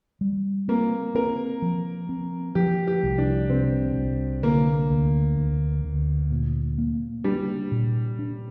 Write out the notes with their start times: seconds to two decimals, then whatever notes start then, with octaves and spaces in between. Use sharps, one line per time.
0.21 G3
0.68 A#3 C4
1.15 C4 A#4
1.62 F3
2.09 C4
2.55 F3 G4
2.87 G4
3.03 C2
3.18 D4
3.49 C3 C4
3.96 C2
4.43 D3 A#3
4.90 D2
5.37 D2
5.84 D2
6.31 A#2
6.78 A#3
7.24 G3 D4
7.71 A#2
8.19 D4